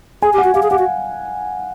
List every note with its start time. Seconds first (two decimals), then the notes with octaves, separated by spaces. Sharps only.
0.22 G#4 G#5
0.33 G4
0.38 F#5
0.44 F#4
0.54 G4 F5
0.63 G#4
0.71 G4 F#5
0.79 F#4